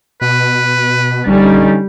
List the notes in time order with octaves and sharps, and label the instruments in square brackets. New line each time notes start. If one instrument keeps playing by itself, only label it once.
[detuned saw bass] B2 [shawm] B4
[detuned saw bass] A#1 [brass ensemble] D3 C#4 D#4 [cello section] G3